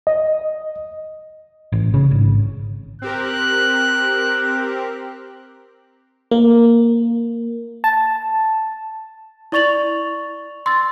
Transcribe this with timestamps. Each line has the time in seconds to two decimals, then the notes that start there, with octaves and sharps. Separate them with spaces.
0.07 D#5
1.72 A1
1.94 C#3
2.11 G#1
3.02 C4 G4 A#4 F#6
6.31 A#3
7.84 A5
9.52 E4 D5 C#6 A6 F7 F#7
10.66 C6 E6 A6